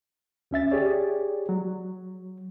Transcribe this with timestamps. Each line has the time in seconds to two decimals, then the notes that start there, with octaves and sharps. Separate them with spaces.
0.51 D2 C#4 E5 A6
0.72 G4 G#4 C#5 D5
1.49 F#3